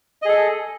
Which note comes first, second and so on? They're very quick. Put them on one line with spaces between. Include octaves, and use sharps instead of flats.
D#5 G#4 A4